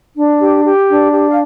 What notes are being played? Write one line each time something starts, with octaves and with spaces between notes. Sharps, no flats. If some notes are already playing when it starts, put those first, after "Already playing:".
D4
G4
G4
D4
G4
F5